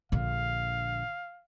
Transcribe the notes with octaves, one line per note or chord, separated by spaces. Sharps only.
A#1 D3 F5